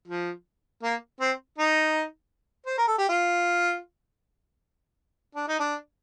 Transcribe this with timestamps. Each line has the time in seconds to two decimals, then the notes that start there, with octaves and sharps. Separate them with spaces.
0.08 F3
0.83 A#3
1.20 C4
1.58 D#4
2.66 C5
2.78 A#4
2.88 A4
2.98 G4
3.09 F4
5.35 D4
5.48 D#4
5.60 D4